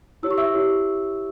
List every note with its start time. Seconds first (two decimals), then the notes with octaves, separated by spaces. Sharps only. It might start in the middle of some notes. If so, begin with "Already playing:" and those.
0.23 E4 G4 C#5 E6
0.31 C#6
0.38 E5 E6
0.53 E4 G4 C#5